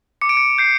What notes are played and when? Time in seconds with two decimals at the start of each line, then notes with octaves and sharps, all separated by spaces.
0.21 D6 C#7
0.29 D7
0.37 C#7
0.58 G6 C7